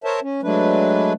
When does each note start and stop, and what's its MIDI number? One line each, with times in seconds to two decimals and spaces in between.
0.04 0.20 70
0.04 0.20 72
0.04 0.20 73
0.04 0.20 76
0.04 0.20 81
0.22 0.41 61
0.43 1.13 54
0.43 1.13 56
0.43 1.13 57
0.43 1.13 62
0.43 1.13 71